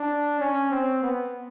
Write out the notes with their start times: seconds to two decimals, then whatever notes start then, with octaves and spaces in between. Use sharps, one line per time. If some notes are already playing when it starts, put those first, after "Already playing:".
Already playing: D4
0.40 C#4
0.71 C4
1.03 B3